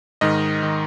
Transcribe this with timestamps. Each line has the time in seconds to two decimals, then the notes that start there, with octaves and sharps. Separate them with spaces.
0.21 G#2 D#3 D#5
0.63 D#3